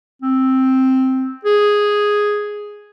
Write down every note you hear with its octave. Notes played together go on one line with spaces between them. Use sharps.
C4
G#4